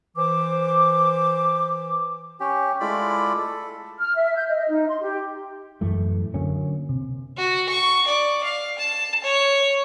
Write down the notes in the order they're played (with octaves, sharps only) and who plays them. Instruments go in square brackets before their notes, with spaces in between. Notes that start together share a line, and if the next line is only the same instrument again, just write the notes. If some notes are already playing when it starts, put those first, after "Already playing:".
[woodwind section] E3 C5 D6
[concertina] C#4 G4
G#3 A3 E4 F4 D5 B5
A4
[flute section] F6
E5
G6
D#5
D#4
C6
G4
[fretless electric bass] F#2 A2 E3 A3
D3 F#3 A#3 C#4
C3
[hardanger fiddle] F#4
C#6
D5
F5
A5
C#5